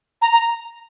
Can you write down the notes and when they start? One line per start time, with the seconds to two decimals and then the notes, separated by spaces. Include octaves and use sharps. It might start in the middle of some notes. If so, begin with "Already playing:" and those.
0.21 A#5
0.32 A#5